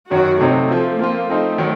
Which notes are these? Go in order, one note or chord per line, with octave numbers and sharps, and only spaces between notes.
F#2 D#3 F#3 F#4
C3 F#3 A3 C4 D#4
F3 C4 F4
F3 A#3 C4 F4
F3 A3 C4 D#4
D#3 F#3